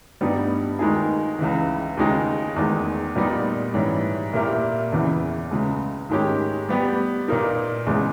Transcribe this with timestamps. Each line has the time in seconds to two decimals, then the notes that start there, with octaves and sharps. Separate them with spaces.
0.21 G2 G3 B3 D#4
0.79 D#2 D#3 G#3 D#4 G#4
1.39 C#2 C#3 E3
1.97 D#2 C#3 G#3 D#4 G#4
2.56 E2 D#3 G#3
3.15 A#2 G3 B3 D#4
3.74 G#2 E3 G3 C#4
4.33 A#2 A#3 E4 G4 A#4
4.92 E2 C#3 E3
5.51 C#2 C#3 G#3
6.09 G#2 D#3 G#3 C#4 G4
6.69 G3 B3 G4
7.28 A#2 A#3 D#4 A#4
7.87 E2 C#3 G#3